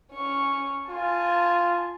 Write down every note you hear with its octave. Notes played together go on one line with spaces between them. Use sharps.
C#4 C#6
F4 G#5 A5